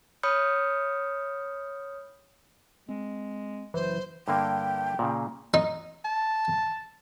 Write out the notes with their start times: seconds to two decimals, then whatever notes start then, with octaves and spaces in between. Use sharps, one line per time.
0.23 C#5 B5 D#6 F6 G6 C#7
2.89 G#3 C4
3.74 F#1 E3 F#3 C5
4.28 G2 D3 A#3 G5
4.99 A#2 C#3
5.54 D#4
6.05 A5